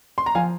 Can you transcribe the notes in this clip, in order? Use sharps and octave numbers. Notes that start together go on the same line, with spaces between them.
C6
A#5
F3 F5 G#5